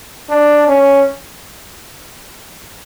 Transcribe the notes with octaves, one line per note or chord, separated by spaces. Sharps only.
D4
C#4